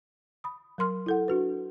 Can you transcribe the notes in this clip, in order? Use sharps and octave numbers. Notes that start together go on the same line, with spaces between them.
B5 D#6
F#3 A#4 C6 F6
E4 A4 F#5
D4 F#4 B4